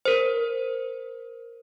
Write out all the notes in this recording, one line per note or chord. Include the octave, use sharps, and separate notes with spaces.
A#4 C5